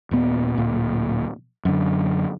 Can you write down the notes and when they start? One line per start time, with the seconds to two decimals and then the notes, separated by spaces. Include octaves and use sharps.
0.11 D#1 A#2 B3
0.58 D1 A#2
1.65 F#2 D3